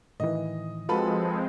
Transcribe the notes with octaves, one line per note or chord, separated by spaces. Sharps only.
A2 D#3 E3 D#5
F3 G#3 C4 F4 F#4 A4 B4 B5